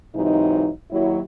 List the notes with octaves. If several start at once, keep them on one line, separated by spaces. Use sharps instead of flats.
G#2 C3 E3 F#3 D#4
D#2 F#3 E4